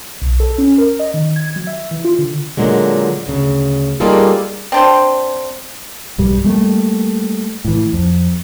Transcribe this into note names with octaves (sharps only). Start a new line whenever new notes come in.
B1
A4
C#4
A#4
D#5
D#3
G#6
F#3
E5
E3
F4
D3
A#2 D3 F#3 G#3
D2 C#3
G3 A#3 D#4 F4 G#4 A4
C4 D4 C5
B1 G2 G3
G3 A3 A#3
A2 E3
F2